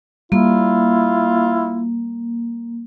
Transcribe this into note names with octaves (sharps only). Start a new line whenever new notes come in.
G3 A#3 E4 F4